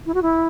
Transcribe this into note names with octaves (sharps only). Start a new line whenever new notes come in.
E4
F#4
E4